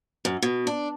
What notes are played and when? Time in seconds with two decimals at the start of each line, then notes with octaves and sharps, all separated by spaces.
0.25 F#2
0.42 B2
0.67 D4